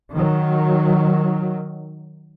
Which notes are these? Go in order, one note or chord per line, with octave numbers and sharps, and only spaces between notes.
D#3 F#3